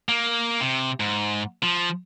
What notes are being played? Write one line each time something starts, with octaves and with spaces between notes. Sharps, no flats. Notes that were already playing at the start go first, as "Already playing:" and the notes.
A#3
C3
G#2
F3